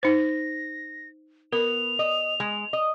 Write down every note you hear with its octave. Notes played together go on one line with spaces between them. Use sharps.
D#4 C5 A#6
B3 A#4 F7
D#5
G#3
D#5